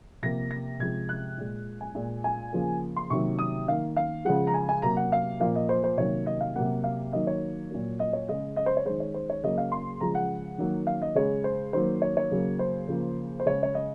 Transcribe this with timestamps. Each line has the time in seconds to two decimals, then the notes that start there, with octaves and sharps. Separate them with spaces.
0.23 C3 F3 A#3 A#6
0.51 A#6
0.79 C3 F3 G#3 G#6
1.09 F#6
1.38 A#2 G#3
1.81 G#5
1.95 A#2 G#3
2.24 G#5
2.53 C#3 F3 A#3
2.96 C6
3.10 C3 D#3 F#3 A#3 C#6
3.39 D#6
3.68 D#3 A#3 F5
3.96 F5
4.25 C#3 F3 G#3 F#5
4.47 A#5
4.54 G#5
4.69 G#5
4.82 C3 F#3 A#3 A#5
4.97 F#5
5.12 F5
5.40 A#2 F3 A#3 F5
5.55 D#5
5.69 C5
5.84 C5
5.97 C3 D#3 F#3 A#3 C#5
6.26 D#5
6.41 F5
6.56 C3 F#3 A#3 F#5
6.84 F5
7.13 D#3 F#3 A#3 D#5
7.27 C#5
7.70 A#2 F#3 A#3
7.99 D#5
8.13 C#5
8.29 C#3 G#3 D#5
8.56 D#5
8.66 C5
8.77 C#5
8.85 D#3 G#3 C5
9.00 C#5
9.14 C5
9.30 C#5
9.43 C#3 F#3 A#3 D#5
9.58 F5
9.72 C6
10.01 C#3 F3 G#3 A#5
10.15 F#5
10.58 D#3 F#3 A#3
10.87 F5
11.02 D#5
11.15 C#3 G#3 C#5
11.44 C5
11.73 D#3 F#3 A#3 C5
12.02 C#5
12.17 C#5
12.32 C#3 F#3 A#3
12.59 C5
12.88 C#3 F3 A#3
13.40 C5
13.46 C#3 G#3 C#5
13.63 C#5
13.74 D#5